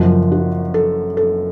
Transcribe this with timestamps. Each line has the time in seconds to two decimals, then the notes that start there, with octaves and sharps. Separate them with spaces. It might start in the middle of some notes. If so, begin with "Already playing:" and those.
Already playing: F#1 F#2 F3 F#4
0.32 F#4
0.74 A4
1.17 A4